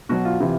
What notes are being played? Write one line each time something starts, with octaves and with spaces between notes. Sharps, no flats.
B2 F#3 F#4
F4
C3 E3